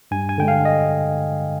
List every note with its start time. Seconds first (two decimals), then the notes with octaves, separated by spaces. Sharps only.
0.11 G2 G#5
0.29 G#5
0.38 D3 G#3 G5
0.48 F5
0.65 D#5